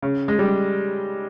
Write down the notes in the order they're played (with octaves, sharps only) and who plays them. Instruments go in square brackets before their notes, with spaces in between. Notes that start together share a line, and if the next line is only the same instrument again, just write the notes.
[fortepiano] C#3
G#3
G3